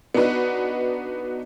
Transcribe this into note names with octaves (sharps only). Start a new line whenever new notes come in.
B3 D4 D#4 F#4 B4